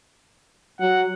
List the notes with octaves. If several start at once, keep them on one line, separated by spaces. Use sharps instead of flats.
F#3 F#5